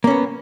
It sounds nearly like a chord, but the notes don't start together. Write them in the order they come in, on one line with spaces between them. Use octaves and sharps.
A#3 C#4 B3